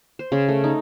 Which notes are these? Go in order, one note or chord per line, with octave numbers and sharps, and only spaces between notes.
C5
C#3
A3
D#4